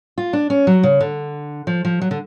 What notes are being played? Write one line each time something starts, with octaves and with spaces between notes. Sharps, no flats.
F4
D4
C#4
F#3
C#3
D3
F3
F3
F#3
D3